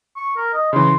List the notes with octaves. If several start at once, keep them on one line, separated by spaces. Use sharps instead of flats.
C#6
A#4
D#5
C#3 E3 C6